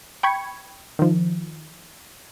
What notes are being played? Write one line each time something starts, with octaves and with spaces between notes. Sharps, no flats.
G5 B5 C#6 G#6 C#7
D#3 F3